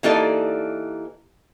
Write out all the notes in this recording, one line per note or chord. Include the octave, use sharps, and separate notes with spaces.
E3 A#3 D#4 G4 A4 D5